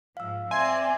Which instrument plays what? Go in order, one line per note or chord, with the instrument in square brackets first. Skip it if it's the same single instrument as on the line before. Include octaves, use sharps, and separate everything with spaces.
[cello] G#2 F3 [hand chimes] F5 E6
[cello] C4 D5 [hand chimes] E5 [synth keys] G#5 [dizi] C6